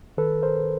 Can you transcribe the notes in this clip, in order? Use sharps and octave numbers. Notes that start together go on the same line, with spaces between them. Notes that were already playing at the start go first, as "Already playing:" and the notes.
D#3 A4 B4
A#4 C5